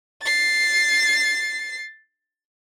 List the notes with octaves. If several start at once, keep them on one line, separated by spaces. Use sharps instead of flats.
A6 C7